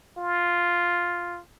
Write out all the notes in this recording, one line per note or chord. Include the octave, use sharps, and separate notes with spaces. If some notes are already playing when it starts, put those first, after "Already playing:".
F4